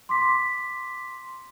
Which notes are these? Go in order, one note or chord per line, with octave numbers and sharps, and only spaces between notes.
C6 D6 B6